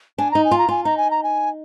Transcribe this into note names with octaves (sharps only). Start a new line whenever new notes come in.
D4 G#5
D#4 A#5
G#5
F4
A#5
F4 G#5
D#4 A#5
G#5
A#5
G#5